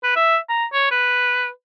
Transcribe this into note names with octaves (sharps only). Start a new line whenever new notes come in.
B4
E5
A#5
C#5
B4